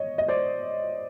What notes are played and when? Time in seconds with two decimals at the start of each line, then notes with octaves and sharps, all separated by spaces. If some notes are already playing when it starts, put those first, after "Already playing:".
Already playing: C#5 D#5
0.18 D#5
0.28 C5 D5